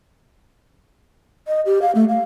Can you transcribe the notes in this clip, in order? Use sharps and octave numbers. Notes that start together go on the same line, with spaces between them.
D#5
G4
F5
A3
F5